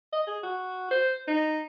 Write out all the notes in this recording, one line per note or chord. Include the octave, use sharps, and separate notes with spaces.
D#5
G#4
F#4
C5
D#4